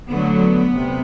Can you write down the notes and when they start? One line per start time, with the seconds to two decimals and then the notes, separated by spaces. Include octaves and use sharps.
0.10 D3 F#3 A3 B3
0.72 C3